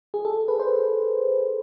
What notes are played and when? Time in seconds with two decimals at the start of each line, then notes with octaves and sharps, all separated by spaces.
0.14 G#4
0.25 A4
0.48 B4
0.59 C5